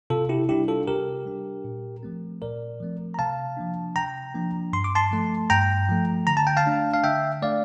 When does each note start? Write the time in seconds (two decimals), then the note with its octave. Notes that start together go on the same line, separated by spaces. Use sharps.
0.10 C3 F4 A4
0.29 E4 G4
0.49 G3 D4 E4 G4
0.68 F4 A4
0.88 C3 G4 A#4
1.26 G3 D4
1.65 A#2
2.03 F3 A3 C4
2.42 A#2 A#4 D5
2.80 F3 A3 C4
3.14 A#5
3.19 C3 F5 A5
3.57 F3 A#3 D4
3.96 C3 G5 A#5
4.35 F3 A#3 D4
4.73 G2 C6
4.84 D6
4.95 A5 C6
5.12 F3 A3
5.50 G2 G5 A#5
5.89 F3 A3
6.27 D3 A#5
6.37 A5
6.47 G5
6.57 F5 A5
6.66 A3 D4
6.94 F5
7.04 D3 E5 G5
7.42 A3 D4 D5 F5